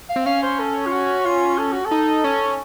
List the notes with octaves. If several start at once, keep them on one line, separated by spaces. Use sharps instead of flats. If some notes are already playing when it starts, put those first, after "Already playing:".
F5
C4
C#4 F5
C5
A4
F4
F#4
F4
A4
F#4
A4
D#4
C#4